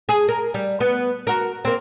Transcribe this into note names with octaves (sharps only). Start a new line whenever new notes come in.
G#4
A#4
G3
B3
F#4 A#4
A#3 C4